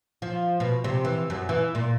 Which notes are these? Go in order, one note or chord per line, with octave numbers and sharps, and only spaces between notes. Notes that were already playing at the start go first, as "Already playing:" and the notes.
F3
B2
C3
E3
F#2
E3
A#2